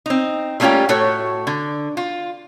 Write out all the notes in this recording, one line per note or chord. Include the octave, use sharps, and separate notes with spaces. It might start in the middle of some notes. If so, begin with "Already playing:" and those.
C4 D#4
G3 A3 A#3 C#4 F4 G4
A2 A3 F#4 A4 C#5
D3
F4